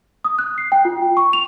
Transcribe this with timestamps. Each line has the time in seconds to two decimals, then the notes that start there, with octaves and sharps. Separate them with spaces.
0.24 D#6
0.39 F#6
0.58 C7
0.72 G5
0.85 F4
1.02 G5
1.17 C#6
1.33 F7